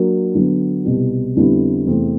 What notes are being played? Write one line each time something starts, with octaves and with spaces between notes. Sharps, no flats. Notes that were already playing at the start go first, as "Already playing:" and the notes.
Already playing: F#3 A#3 D4 F#4 A#4
D3 F#3 B3
C2 B2 G3 B3
F2 D3 G3 B3 E4
E2 C3 E3 A3 C4